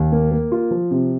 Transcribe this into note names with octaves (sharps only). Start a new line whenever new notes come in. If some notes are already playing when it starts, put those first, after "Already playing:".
Already playing: D#2
A#3
A#3
F4
F3
C3